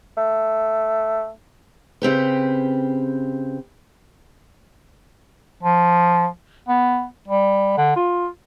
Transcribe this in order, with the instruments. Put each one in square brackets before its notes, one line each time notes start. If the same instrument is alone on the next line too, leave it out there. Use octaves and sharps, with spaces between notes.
[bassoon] A3
[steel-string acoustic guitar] C#3 C4 G4 B4
[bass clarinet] F3
B3
G3
D3
F4